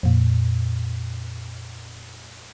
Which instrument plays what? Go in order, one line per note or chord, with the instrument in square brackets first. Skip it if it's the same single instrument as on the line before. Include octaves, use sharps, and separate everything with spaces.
[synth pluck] F2 A#2